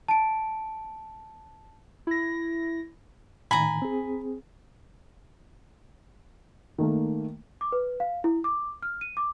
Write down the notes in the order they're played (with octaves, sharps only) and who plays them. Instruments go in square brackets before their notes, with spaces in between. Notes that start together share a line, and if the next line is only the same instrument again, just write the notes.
[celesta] A5 D7
[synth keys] E4 A#6
[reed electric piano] A2 D#3 [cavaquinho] G#5 A#5 [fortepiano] B5
[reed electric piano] C4 G#4
[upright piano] D#3 A3 A#3
[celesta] D6
B4
F5
E4
D6
F6
D#7
D6